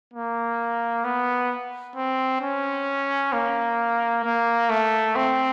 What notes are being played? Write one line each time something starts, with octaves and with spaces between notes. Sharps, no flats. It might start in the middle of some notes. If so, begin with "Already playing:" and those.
A#3
B3
C4
C#4
A#3
A#3
A3
C4